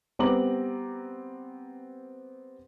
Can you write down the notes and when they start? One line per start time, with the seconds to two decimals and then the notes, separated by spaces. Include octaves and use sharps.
0.19 G3 B3 C4 A#5 D6 F#7